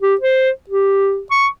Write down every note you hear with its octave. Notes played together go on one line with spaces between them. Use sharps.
G4
C5
G4
C#6